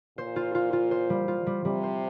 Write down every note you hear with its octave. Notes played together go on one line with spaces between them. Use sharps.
A#2 C5
F4
F4
F4
C5
G3
F4
G3
C3 G3
C5